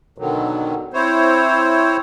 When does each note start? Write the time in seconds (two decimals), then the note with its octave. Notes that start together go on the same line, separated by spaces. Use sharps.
0.18 B2 D3 D#3 F#3
0.94 C4 E4 C5 C#5